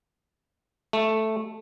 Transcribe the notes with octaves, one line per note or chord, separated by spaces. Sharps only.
A3